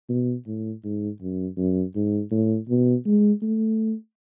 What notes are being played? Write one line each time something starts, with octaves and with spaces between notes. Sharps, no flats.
B2
A2
G#2
F#2
F#2
G#2
A2
B2
G#3
A3